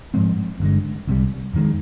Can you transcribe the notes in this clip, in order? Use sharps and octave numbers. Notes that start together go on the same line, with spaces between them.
G#2 F3 G#3 C4
G1 G2 D3 G#3
C2 C3 G3
F2 D#3 G#3